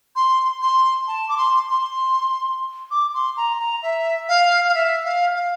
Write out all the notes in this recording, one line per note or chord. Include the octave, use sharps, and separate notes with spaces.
C6
C6
A5
D6
C6
C6
D6
C6
A#5
A#5
E5
F5
F5
E5
F5
F5